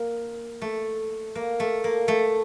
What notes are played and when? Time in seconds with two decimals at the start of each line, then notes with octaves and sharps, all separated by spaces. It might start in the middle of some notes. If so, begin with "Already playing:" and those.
Already playing: A#3
0.62 A3
1.35 A#3
1.60 A3
1.84 A#3
2.08 A3